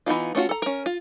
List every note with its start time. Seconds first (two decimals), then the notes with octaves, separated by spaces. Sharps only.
0.06 E3 B3 D#4 F4
0.35 A3 C#4 F4 F#4
0.49 A4 A#5
0.62 C#4 A#4
0.86 F4